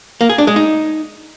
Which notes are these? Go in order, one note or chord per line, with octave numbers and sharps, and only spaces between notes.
A#3
G#4
D4
G#3
D#4